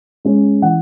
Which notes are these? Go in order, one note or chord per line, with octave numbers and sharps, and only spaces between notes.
G#3 C#4
E3 F#5